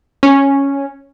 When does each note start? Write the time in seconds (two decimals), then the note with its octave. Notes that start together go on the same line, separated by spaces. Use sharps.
0.23 C#4